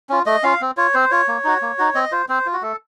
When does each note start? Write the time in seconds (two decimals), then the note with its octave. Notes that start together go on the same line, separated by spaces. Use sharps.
0.09 C#4 F4
0.26 A3 D#5
0.43 C#4 F4 F5
0.61 C4
0.77 F4 C#5
0.94 C4 C5
1.11 F4 C#5
1.28 A#3
1.44 D#4 F#4
1.62 A#3
1.79 D#4 F#4
1.95 C4 D#5
2.12 F4 C5
2.29 C4 C5
2.46 F4
2.53 F#4
2.62 A3 A4